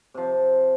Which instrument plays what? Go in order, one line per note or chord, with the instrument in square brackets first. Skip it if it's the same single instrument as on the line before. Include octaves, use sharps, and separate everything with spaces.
[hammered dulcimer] C3 F3